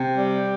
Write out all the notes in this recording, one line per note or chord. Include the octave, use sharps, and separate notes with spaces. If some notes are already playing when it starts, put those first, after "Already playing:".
Already playing: C3
G3